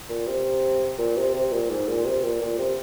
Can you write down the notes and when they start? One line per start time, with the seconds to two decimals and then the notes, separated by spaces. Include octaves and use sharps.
0.09 A#2
0.28 C3
0.98 A#2
1.17 C3
1.34 C3
1.52 A#2
1.70 G#2
1.88 A#2
2.05 C3
2.24 A#2
2.41 A#2
2.58 C3